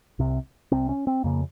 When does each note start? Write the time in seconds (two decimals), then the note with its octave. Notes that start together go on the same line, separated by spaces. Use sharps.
0.19 C2 C3
0.72 C2 C3 C4
0.89 C#4
1.07 C4
1.24 F2 C#3 A#3